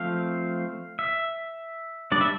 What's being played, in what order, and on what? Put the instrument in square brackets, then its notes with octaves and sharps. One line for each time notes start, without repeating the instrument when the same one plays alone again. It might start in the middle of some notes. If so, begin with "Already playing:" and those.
Already playing: [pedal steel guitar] F3 A3 C4 F5
E5
G3 D4 D5
E5